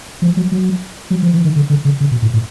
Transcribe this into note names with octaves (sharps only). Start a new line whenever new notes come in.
F3
F#3
F#3
F#3
F3
E3
D#3
D3
D3
C#3
C#3
B2
A2
A2